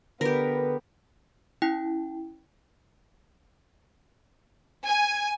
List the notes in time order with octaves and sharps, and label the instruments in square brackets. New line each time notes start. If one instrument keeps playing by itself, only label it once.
[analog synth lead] D3 [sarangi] B3 [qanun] G4 A#4 [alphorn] B4
[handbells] C#4 E4 G5
[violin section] G#5